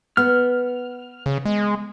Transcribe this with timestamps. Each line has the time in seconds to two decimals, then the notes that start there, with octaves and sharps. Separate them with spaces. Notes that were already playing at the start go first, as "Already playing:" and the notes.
0.17 B3 F6
1.26 C#3
1.45 G#3